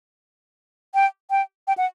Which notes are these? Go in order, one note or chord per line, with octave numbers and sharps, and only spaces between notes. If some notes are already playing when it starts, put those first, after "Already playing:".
G5
G5
G5
F#5